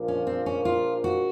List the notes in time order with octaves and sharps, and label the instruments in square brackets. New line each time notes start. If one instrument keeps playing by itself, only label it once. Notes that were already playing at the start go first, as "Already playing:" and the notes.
Already playing: [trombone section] A#1 A#2 F3 A#3
[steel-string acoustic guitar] C#4
C4
C#4
F4
F#4